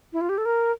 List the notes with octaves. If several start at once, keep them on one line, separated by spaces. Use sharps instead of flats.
E4
F4
G4
A4
A#4